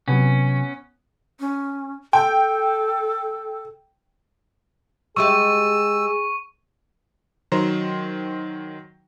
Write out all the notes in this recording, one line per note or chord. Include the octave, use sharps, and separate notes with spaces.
C3 F#3 B3 C#4
C#4
A4 G5
G#3 G4 G#4 E5 C#6 E6 D#7
D#3 F#3 C5 A#5